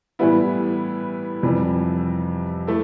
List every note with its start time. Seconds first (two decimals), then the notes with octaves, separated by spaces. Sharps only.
0.19 A2 E3 G3 B3 E4
1.43 F2 C3 E3 G3
2.67 A3 E4